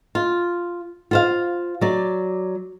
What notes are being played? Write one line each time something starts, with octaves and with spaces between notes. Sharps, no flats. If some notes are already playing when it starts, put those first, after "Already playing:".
F4
F4 C5 F5
F#3 D5